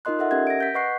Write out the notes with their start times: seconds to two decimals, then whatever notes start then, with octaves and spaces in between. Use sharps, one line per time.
0.05 D#4 F4 A#4 D#5 C6 F#6
0.19 A4 D#5 E5 F#5
0.31 C#4 G4 A#4 E5 F#5 G#6
0.47 A#6 D7
0.60 G6 B6
0.74 B4 D#5 F#5 C#6 F#6 C7